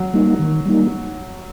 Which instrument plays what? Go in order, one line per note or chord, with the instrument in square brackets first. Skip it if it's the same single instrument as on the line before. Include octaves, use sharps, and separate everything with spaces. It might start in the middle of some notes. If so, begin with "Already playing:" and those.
Already playing: [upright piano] F#3
[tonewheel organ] G3 A#3 D#4
D#3
G3 A#3 D#4